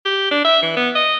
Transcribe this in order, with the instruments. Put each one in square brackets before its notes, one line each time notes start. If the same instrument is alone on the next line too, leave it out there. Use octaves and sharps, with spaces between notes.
[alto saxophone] G4
D4
E5
E3
B3
D#5